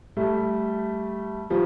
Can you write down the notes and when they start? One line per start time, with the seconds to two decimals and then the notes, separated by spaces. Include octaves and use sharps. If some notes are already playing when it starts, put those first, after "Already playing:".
0.17 G3 A3
1.50 F3 G3